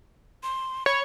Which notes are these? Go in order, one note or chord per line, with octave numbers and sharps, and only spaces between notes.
C6
C#5 B5